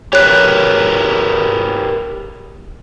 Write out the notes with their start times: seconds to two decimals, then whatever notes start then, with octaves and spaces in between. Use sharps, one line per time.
0.13 G4 A#4 B4 C#5 F#6